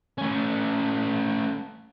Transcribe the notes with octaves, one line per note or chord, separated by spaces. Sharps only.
A3 C#4